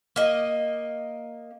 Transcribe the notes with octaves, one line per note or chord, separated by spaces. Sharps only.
A#3 D#5